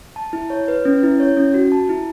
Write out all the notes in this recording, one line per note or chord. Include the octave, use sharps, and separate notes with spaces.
A5
E4
C#5
B4
C#4
E4
C#5
C#4
F#4
A5
E4